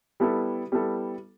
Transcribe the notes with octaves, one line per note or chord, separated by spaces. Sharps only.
G3 B3 E4 A4
G3 B3 E4 A4